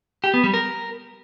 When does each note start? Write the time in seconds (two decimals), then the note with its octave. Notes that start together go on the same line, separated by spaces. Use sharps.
0.24 G4
0.34 B3
0.44 G3
0.54 A#4